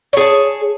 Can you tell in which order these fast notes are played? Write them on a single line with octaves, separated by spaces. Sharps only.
C#5 G#4 A5